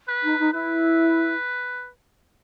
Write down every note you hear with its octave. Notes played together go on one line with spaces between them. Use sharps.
B4
D#4
D#4
E4 B4